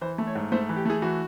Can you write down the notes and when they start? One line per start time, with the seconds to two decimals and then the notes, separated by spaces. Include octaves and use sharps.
0.01 E3 C5
0.18 A3
0.27 C#5
0.35 G#2
0.52 A3 C5
0.69 E3
0.76 G4
0.85 A3 G#4
1.02 E3 F#4